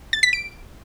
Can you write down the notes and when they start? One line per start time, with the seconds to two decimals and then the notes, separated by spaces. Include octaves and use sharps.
0.13 A6
0.23 B6
0.33 D7